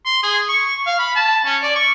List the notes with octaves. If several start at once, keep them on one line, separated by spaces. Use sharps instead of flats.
C6
G#4
C#6
F5
B5
A5
C#4
D5
C#6